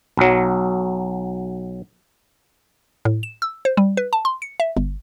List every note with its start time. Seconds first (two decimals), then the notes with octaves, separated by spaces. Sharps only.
0.17 B1 F#3
3.05 A2
3.23 E7
3.42 E6
3.65 C5
3.77 G3
3.97 B4
4.13 A5
4.25 C6
4.42 C#7
4.60 E5
4.77 G1